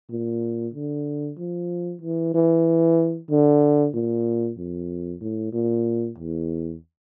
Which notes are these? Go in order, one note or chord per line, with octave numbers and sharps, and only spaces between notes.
A#2
D3
F3
E3
E3
D3
A#2
F2
A2
A#2
E2